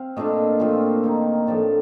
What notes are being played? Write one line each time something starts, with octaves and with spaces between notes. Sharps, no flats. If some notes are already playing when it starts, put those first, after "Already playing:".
Already playing: C4 F5
A#2 A3 D4 F4 D#5
A#2 A3 C4 F4
D#3 A#3 D#4
A2 F3 A3 D4 D5